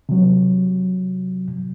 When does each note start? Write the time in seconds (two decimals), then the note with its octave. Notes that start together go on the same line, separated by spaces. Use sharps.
0.09 C3 F#3